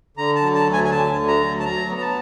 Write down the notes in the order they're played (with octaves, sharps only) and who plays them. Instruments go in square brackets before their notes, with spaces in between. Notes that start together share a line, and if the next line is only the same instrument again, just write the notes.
[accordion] D3 A#5
A5
F#3
A5
D2
G#5
G#5
D3 A5
D2
A#5
F#3
A5
F#3 A#5
B3
A#5
A5